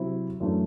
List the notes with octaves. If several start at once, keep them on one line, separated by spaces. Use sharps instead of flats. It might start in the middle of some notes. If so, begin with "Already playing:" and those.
Already playing: C3 F#3 C4 E4
F#2 E3 A3 D4